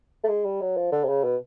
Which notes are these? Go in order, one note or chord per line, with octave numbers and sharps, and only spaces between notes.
A3
G#3
G3
F#3
F3
D3
C3
C#3
B2